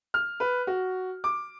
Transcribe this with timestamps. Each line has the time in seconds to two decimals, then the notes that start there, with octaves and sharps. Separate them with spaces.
0.14 F6
0.40 B4
0.67 F#4
1.24 D6